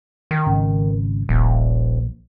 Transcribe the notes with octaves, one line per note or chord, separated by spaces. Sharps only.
D#3
G#1 C#3
D#1 A#1